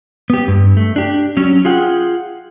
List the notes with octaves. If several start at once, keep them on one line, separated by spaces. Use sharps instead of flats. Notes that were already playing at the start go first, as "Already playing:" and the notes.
B3 G4
G2
A3
D4 G4
F#3 C#4
F4 G#4 F#5 G5